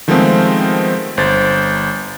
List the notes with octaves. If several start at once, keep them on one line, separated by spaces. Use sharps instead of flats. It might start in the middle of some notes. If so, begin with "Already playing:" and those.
D#3 F3 G#3 A3 B3 C4
G1 C5 A6